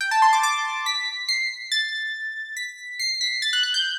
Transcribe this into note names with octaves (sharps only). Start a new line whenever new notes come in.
G5
A5
C6
D6
D6
B6
C7
A6
B6
C7
B6
A6
F#6
F#6
G6